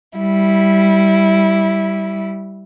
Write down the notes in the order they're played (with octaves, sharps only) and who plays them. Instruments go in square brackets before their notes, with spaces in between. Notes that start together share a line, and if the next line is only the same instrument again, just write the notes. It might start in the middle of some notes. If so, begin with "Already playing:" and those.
[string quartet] G3 E4